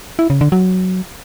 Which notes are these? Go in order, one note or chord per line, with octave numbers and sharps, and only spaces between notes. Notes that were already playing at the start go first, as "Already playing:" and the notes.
E4
C#3
D3
F#3